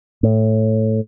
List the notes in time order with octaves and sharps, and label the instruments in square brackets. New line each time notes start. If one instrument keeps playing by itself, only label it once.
[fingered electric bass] A2